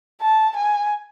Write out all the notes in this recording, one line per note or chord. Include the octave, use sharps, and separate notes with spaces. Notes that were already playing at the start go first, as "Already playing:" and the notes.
A5
G#5